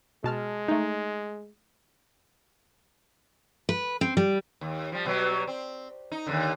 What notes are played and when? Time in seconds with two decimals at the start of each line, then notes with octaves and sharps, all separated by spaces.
0.24 B2 G#3 A5 F6
0.68 A3 D#4
3.69 B4
4.01 C4
4.17 G3
4.61 D#2
4.92 F3 G3
5.06 B2 F#3 G3
5.47 C4
6.12 D#4
6.27 D#2 G#2 D3